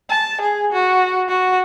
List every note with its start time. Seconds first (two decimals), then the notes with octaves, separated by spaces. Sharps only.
0.10 A5
0.42 G#4
0.72 F#4
1.29 F#4